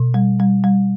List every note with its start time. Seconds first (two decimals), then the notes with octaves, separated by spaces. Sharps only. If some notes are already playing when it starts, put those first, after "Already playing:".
Already playing: B2
0.14 G3
0.40 G3
0.64 G3